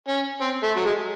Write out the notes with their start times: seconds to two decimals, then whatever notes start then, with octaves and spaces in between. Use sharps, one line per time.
0.08 C#4
0.41 C4
0.63 A3
0.76 F#3
0.85 G#3